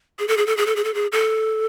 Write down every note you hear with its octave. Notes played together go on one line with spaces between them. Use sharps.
G#4
A4
G#4
A4
G#4
A4
G#4
A4
G#4
A4